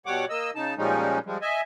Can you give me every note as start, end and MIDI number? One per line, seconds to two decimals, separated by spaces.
0.06 0.25 47
0.06 0.25 55
0.06 0.25 73
0.06 0.25 78
0.06 0.25 86
0.29 0.51 58
0.29 0.51 75
0.29 0.51 88
0.55 0.74 49
0.55 0.74 63
0.55 0.74 81
0.78 1.19 46
0.78 1.19 53
0.78 1.19 55
0.78 1.19 56
0.78 1.19 61
0.78 1.19 63
1.26 1.38 53
1.26 1.38 55
1.26 1.38 56
1.42 1.61 75
1.42 1.61 76
1.42 1.61 80